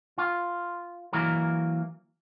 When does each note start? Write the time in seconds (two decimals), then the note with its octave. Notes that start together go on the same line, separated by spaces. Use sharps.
0.18 F4
1.13 E3 F#3 A#3 A#4